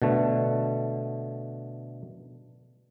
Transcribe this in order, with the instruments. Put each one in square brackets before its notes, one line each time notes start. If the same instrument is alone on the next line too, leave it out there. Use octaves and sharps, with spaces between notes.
[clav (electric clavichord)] B2 D3 A3